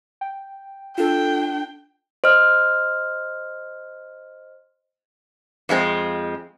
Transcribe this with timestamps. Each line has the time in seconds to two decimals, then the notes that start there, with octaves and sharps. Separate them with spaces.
0.21 G5
0.98 D4 F4 A4 G5
2.24 C5 D#5 F6
5.69 F2 F3 G#3 C4